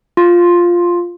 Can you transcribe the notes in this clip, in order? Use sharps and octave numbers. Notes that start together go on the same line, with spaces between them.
F4